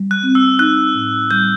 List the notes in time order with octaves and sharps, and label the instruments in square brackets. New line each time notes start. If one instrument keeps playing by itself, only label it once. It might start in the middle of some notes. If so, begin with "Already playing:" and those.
Already playing: [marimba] G3
[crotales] F#6
[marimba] C4
[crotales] E6
[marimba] D#4 [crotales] F#6
[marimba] A2
[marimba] G3 [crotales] G6